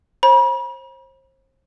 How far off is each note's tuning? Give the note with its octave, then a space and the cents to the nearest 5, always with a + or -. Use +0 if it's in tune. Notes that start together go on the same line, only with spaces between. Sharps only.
C5 +35 B5 -45